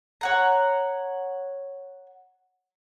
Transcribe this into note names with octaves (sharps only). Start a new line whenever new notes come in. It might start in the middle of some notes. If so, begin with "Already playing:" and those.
C#5 F#5 A#5